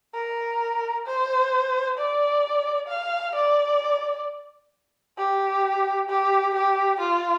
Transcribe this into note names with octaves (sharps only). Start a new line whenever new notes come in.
A#4
C5
D5
F5
D5
G4
G4
G4
F4